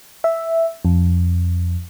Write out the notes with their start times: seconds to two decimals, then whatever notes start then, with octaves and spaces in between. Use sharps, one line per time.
0.24 E5
0.85 F2